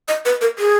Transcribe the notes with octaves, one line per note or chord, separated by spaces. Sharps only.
D#5
B4
A#4
G#4